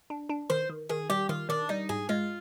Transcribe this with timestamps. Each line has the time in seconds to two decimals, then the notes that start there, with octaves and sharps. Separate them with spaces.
0.10 D4
0.29 D4
0.50 D#3 C5
0.70 D#3
0.89 D#3 G#4
1.10 G3 G4
1.29 D#3 F4
1.49 D#3 D4
1.69 G3 D#4
1.89 G#2 G#4
2.09 G#3 F4